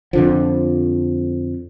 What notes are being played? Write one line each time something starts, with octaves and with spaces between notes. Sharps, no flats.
F2 D3 F3